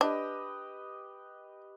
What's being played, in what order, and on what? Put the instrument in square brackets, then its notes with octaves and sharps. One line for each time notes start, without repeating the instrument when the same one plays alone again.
[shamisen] D4 [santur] G4 B4 D#5